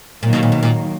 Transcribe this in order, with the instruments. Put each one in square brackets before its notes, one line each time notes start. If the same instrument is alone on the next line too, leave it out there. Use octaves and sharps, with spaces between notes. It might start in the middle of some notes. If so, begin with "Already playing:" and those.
[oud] A#2 [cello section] D#3 F#3 A#3
[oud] B2
A#2
B2
A#2